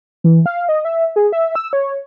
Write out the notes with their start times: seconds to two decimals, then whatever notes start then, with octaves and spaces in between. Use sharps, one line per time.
0.24 E3
0.46 F5
0.69 D#5
0.85 E5
1.16 G#4
1.32 E5
1.55 E6
1.73 C#5